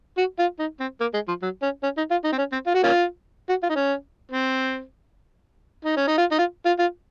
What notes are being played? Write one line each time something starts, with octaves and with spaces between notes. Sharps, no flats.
F#4
F4
D#4
C4
A#3
G#3
F3
F#3
C#4
C#4
D#4
F4
D#4
C4
C#4
C4
F4
F#4
A#3 C#4 F4
F#4
F4
D#4
C#4
C4
D#4
C#4
D#4
F4
D#4
F4
F4
F4